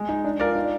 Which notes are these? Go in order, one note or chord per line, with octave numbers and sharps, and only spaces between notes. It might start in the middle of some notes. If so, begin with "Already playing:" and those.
Already playing: G#3
D#4
D4
F4 A#4 D5
D#4